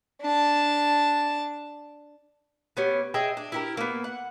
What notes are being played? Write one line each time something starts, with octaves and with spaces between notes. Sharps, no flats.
D4 A5
B3 C#4 G4
G#4 D#5 E5 G5
D4
E4 G4 A#4
A#3 B3
F#5